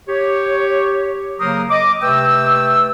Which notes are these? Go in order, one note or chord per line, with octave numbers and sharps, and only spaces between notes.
G4 C#5
C#3 F#3 A#3 A#4 C5 D#6
D#5 D6
C3 A3 B4 G5 E6